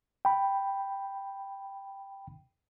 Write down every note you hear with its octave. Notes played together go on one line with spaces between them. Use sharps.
G5 B5